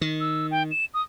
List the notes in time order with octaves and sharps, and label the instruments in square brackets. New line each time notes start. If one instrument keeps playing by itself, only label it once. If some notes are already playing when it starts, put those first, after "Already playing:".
[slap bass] D#3
[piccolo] E6
G5
E7
D#6